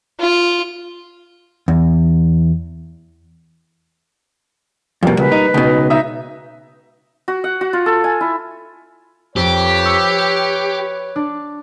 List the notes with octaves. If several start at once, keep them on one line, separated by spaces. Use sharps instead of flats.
F4
E2
F2 B2 G3 A#3
C#2 B4
D#4
C#2 B2 D#4
D#4 E5 D#6
F#4
F#5
F#4
F4
A4
G#5
E4
F2 G4 B4 C#5
C#6 E6 C#7
D4